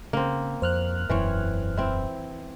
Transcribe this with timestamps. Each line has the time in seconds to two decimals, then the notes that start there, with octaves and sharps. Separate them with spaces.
0.13 C#3 A#3 C4
0.62 F2 C5 F6 F#6
1.10 E1 F#2 E3 C4 C#5
1.77 C4 E4